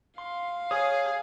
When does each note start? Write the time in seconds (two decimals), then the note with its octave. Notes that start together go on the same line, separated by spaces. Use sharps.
0.18 F5 C6
0.71 G#4 C#5 D#6